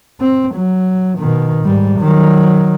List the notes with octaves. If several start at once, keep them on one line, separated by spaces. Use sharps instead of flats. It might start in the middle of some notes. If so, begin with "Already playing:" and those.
C4
F#3
B2 D#3
G#2 G3
D#3 F#3